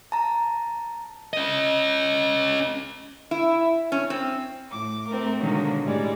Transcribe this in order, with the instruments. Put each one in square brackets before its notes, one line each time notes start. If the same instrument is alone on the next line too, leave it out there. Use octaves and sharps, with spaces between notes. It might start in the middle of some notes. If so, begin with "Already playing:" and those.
[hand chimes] A5 A#5
[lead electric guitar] C#4 D#5
[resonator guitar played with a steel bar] E4
C#4
C4
[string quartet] A2 D6
A3 C4 A#4
B2 D3 D#3 F#3 G#3 A#3
A2 G3 G#3 D5